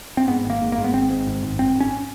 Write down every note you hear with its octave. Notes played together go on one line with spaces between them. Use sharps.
C4
G#2 B3
G#1 A#3
G#2
A#3
G#2
B3
G#1 C4
G#2
G#1
G#1
G#1 C4
G#1 C#4